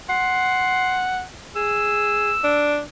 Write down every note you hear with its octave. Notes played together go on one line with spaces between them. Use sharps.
F#5 C6
G#4 E6
D4